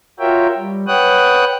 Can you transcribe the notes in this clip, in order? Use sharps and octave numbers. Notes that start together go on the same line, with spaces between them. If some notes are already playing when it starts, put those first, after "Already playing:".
F4 F#4 A#4 C#5 E5 G5
G3
B4 C#5 F#5 G5 D#6 F#6